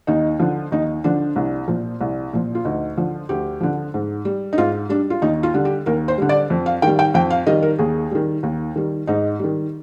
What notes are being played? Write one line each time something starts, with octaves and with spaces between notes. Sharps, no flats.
D#2 D#4
D3 F3
D#2 D#4
D3 F3 D4
C2
A#2 F3
C2
A#2 F3
F4
D2 D#4
D3 F3
D2 G4
D3 F3
G#2
G3
D#4
G#2 F4
G3 D4
F4
D#2 D#4
F4
D3 G3
G4
D#2 A#4
C5
D3 G3
D5
F2
F5
D#3 G3 G5
G5
F2 G5
F5
D#3 G3 D#5
A#4
D#2 G#4
D#3 G3
D#2
D#3 G3
G#2 D#4
D#3 G3